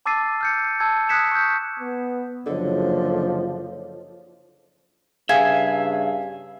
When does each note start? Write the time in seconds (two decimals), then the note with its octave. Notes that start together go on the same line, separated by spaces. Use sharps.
0.06 A5 D6 E6 A6 C7 D#7
0.41 F6 G6 C#7
0.80 A5 E6 G#6
1.09 D#6 F#6 G#6 B6 C#7 E7
1.32 C#6 G6
1.79 B3
2.46 F#1 D3 F3 C#5 D#5
5.29 G2 C#3 G#4 E5 F5